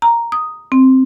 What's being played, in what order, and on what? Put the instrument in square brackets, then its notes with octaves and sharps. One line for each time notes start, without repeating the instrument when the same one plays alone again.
[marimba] A#5
D#6
C4